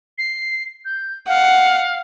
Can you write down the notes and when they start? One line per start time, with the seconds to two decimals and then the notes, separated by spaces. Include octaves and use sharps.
0.18 C7
0.85 G6
1.28 F5 F#5